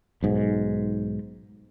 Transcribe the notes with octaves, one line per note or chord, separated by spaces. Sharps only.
B1 G#2